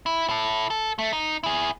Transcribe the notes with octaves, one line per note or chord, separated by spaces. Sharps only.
E4
E4 A4
A4
A3
D#4
E4 G#4